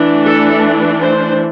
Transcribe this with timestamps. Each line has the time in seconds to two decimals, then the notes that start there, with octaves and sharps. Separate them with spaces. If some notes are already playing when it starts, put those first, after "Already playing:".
Already playing: E3 A3 D4
0.26 A4
1.01 C5